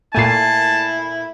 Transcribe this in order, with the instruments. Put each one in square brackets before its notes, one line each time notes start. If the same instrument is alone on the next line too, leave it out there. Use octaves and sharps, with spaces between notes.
[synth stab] A#2 A3 [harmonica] E4 [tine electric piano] G#5 C7 [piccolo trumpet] A5